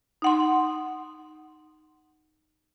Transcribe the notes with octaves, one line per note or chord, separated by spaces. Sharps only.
D#4 F#5 C6